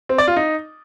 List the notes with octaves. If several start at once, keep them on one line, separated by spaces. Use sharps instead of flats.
C4
D5
F4
D#4